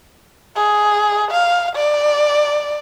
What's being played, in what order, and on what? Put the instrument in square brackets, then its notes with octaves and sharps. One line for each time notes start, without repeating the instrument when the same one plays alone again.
[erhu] G#4
F5
D5